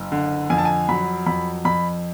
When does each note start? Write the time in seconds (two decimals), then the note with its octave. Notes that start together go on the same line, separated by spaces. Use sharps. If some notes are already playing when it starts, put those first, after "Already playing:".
Already playing: F#1
0.12 D3
0.50 F2 G#5
0.58 A5
0.65 G#5
0.89 F#3 B5
1.26 F2 B5
1.65 F2 B5